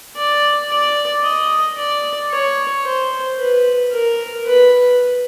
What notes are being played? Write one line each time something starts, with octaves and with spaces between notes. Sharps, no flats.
D5
D5
D#5
D5
C#5
C5
B4
A#4
B4